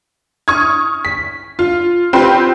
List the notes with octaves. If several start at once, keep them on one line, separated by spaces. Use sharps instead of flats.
C#6 D#6 F6 G#6
B6
F4
C4 F4 G4 B4 C6